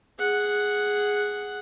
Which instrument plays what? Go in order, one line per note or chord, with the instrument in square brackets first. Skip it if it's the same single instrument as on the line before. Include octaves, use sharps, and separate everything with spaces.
[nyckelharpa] G#4 F#5